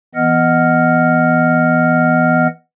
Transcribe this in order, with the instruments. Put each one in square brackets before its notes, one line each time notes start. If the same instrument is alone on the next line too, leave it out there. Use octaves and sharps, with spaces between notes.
[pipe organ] E3 B3 D#5 F#5 F6